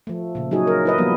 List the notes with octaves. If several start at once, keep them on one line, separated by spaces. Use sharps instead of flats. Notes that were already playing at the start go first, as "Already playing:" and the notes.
F3 A3
A#2 C#3
F#3 D#4 F#4 G#4
A#4
E4 B4 D#5
F3 G3 A#3 B3